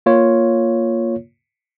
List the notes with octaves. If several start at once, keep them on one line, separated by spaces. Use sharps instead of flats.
A#3 F4 C#5